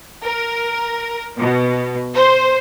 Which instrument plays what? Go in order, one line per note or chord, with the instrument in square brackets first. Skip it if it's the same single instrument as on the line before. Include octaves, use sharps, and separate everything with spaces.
[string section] A#4
B2
C5